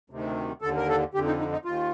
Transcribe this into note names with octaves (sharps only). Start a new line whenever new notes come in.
D2 C3 D#3
D#2 D3 A4
A#4
A4
F2 D3 G4
D#4
D#4
D#4
D#2 D#3 F4